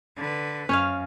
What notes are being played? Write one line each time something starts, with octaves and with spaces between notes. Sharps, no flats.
D3 B4
F#2 C#4 C#5 F5